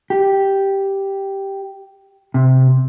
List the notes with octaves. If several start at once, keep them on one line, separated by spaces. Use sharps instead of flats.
G4
C3